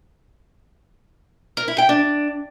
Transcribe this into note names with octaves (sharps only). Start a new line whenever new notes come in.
A#4
E4
G5
D4